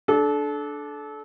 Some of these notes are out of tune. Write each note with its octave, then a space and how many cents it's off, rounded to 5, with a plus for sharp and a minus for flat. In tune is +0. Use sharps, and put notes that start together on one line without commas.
D4 +0 A4 -30